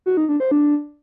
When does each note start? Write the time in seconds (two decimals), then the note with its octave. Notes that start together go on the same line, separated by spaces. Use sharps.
0.06 F#4
0.17 D#4
0.29 D4
0.40 C5
0.51 D4